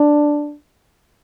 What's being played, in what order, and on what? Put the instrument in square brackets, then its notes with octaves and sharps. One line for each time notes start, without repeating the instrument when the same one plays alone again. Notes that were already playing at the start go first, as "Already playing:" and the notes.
Already playing: [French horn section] D4